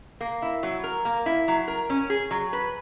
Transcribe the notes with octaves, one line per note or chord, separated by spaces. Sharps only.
A#3
E4
F#3
A#4
A#3
E4
F#3
A#4
C#4
G#4
F#3
B4